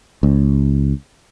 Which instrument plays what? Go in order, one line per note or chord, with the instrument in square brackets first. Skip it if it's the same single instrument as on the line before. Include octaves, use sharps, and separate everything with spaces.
[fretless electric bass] C#2